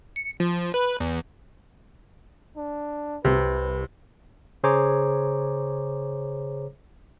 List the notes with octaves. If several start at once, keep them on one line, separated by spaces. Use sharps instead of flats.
C#7
F3
B4
E2
D4
C2 C3 B4
C#3 G#4 C5 C#5 A#5 D6